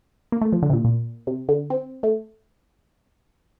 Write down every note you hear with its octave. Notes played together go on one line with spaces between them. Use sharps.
A#3
A3
F3
D3
C3
A#2
A#2
C3
D3
C4
A3